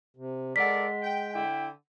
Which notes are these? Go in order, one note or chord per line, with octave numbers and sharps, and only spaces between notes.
C3
G#3 A4 A#4 D5 F#5 B6
G5
D3 E4 G5